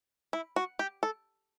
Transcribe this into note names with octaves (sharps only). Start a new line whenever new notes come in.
E4
F#4
G4
A4